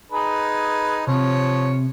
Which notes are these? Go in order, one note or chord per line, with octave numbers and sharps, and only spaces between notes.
D#4 G#4 B4
C3 F3 C#5